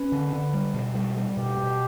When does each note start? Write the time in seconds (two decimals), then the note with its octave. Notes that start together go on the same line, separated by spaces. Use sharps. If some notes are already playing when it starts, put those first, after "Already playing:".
Already playing: C#4 B4
0.12 D3
0.33 D3
0.54 G3
0.74 B2
0.95 G3
1.17 G3
1.36 B2 G4
1.58 B2